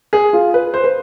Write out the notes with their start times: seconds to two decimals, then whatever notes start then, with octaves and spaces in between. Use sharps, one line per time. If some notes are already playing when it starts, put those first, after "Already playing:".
0.13 G#4
0.33 F4
0.54 B4
0.74 C5
0.84 B4